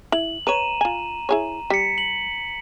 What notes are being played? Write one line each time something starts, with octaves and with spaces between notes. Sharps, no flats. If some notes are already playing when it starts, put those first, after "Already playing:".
E4 F#7
B4 C#5 A#5 D#7 E7
F4 G#5
E4 G#4 C#5
G3 B6 C#7
F#7